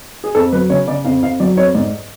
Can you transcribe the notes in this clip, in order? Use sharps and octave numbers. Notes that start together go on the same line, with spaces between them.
G#4
F2 A4
F#3 B4
C#3 C#5
C#3 D5
F2 F5
F2 F5
F#3 D5
F2 C#5
G#2 D5